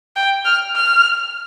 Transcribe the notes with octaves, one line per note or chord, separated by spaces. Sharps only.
G5
F6
F6